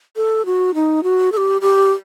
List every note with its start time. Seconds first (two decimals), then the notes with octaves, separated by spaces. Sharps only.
0.16 A4
0.46 F#4
0.75 D#4
1.03 F#4
1.32 A4
1.37 G4
1.61 G4